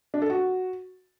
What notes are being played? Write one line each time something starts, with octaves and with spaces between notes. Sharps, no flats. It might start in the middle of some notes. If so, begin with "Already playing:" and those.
D4
A4
F#4